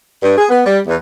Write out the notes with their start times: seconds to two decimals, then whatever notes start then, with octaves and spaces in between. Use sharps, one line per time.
0.23 G2
0.38 G#4
0.50 B3
0.66 G3
0.87 E2